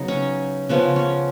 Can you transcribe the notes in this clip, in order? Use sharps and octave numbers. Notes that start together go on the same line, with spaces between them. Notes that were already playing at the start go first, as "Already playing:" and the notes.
Already playing: C#3 F#3 B3 D#4
C#4
C#3 F3 B3 C#4
C#4